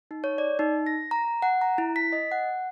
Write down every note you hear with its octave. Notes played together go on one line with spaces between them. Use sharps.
D#4
C#5
D5
D#4
A#6
A#5
F#5
A#5
E4
B6
D#5
F#5